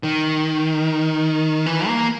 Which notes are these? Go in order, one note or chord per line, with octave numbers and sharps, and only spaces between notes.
D#3
E3
A#3